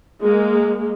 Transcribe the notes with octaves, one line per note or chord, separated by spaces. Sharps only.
G#3 A#3